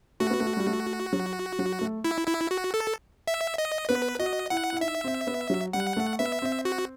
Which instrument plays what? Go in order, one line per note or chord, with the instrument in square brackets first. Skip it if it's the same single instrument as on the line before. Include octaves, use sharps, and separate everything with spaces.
[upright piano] A3 [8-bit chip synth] F#4
[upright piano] B3
A3
G3
A3
F#3
F#3
A3
[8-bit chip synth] E4
E4
F#4
A4
E5
D#5
[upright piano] B3 [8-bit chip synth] B4
[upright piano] F#4 [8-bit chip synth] D#5
[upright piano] E4 [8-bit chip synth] F#5
[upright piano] E4
[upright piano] D#4 [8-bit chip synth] E5
[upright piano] C4
B3
F#3
[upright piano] G3 [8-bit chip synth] F#5
[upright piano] A3
[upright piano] B3 [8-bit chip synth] E5
[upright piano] C4
[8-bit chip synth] F#4